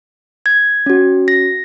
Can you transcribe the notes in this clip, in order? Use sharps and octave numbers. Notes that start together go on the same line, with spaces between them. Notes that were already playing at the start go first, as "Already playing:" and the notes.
G#6
C#4 F#4
A#6